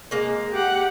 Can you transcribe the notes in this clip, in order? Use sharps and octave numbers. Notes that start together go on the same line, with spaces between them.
G#3 A#3
G4 F#5